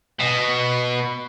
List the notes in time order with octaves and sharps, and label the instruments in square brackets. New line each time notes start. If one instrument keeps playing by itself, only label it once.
[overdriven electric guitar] B2